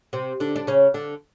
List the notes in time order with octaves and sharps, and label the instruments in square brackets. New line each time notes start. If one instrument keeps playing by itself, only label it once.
[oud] C3 C4
D3 D4
D4
C#3 C#4
D3 D4